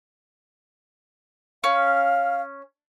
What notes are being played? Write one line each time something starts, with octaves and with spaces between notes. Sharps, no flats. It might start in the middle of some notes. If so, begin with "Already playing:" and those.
C#4 F5